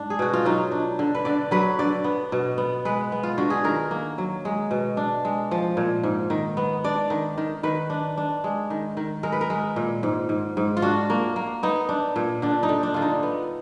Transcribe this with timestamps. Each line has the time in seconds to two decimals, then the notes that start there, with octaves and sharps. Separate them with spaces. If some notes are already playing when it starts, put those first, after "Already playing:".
Already playing: G#2 D4
0.10 G#4
0.19 B2 F#4
0.33 F4
0.45 F#3 D#4
0.71 D4
0.99 D3
1.15 B4
1.25 D3 D5
1.51 F#3 B4
1.79 D3 D5
2.04 B3
2.32 B2
2.58 B3
2.85 G#3 B4
3.12 B3
3.23 F4
3.38 D3 F#4
3.50 G#4
3.64 D#3 A#4
3.91 A#3
4.18 F#3
4.45 G#3
4.71 B2
4.97 D4
5.25 G#3
5.51 F3
5.77 A#2
6.03 G#2
6.30 D#3
6.57 B3
6.84 D4 D5
7.10 D#3
7.38 D#3
7.63 D#3 B4
7.90 D4
8.17 D4
8.44 G#3
8.70 D#3
8.97 D#3
9.23 G#3 A#4
9.32 B4
9.41 A#4
9.50 G#3
9.76 A#2
10.03 G#2
10.29 G#2
10.57 G#2
10.77 F4
10.82 D4 F#4
11.10 A#3
11.36 A#3
11.63 B3 D#4
11.89 D4
12.16 A#2
12.42 D3 D4
12.63 D#4
12.69 D3
12.83 D4
12.94 D3 F4
13.02 D#4
13.23 B3